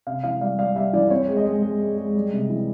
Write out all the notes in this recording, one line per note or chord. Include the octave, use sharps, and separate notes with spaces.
C3 F5
E3 F5
G3 F5
G3 F5
G3 E5
E3 D5
C4 C#5
G#3
D#5
G#3
G#3
G#3
G#3
G3
C3
E3